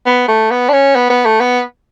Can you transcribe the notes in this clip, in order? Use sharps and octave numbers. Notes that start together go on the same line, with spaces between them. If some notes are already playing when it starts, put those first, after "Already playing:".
B3
A3
B3
D4
C#4
B3
B3
A3
B3